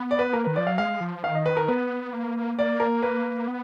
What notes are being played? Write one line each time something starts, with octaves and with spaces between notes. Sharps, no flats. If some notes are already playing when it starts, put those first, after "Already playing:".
Already playing: B3
D5
B4
A#3 A#4
D#3 B4
F3 D5
F#3 F5
G#3 F5
F3
D#3 F5
D#5
B4
A#4
B3 B4
A#3
A#3 D5
A#4
B4
B3